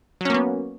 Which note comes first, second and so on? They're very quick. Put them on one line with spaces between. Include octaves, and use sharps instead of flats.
F#3 C#4 A#3 B3